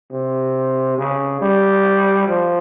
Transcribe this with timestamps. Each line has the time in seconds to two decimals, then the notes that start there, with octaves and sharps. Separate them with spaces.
0.11 C3
0.98 C#3
1.41 G3
2.27 F3